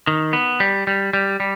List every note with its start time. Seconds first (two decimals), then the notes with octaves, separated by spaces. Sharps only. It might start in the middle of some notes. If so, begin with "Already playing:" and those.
0.07 D#3
0.33 B3
0.60 G3
0.87 G3
1.13 G3
1.40 G3